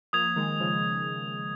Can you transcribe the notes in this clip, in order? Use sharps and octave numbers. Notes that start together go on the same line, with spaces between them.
F3 A#3 D#6 G#6 F7
D#3 G#3
C#3 F3